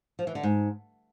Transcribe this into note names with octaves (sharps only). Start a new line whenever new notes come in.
F3
E3
D3
G#2